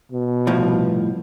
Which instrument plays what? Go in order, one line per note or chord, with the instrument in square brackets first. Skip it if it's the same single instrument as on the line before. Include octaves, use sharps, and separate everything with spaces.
[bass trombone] B2
[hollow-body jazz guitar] C2 A2 F3